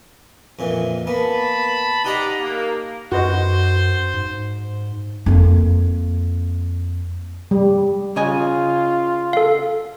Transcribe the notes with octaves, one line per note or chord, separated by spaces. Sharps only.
F2 A#2 E3
A#3 B3 A5 B5
D#4 G4 D5 D#5 F#5 A#5
A#3
F#2 F#4 B4 C5 D#5
G#2
F2 A#3
G3
C#3 F4 D#5 G#5
A4 F5